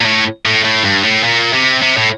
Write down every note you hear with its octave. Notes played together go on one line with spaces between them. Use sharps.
A#2
A2
A2
A2
G2
A2
A#2
C3
C3
A2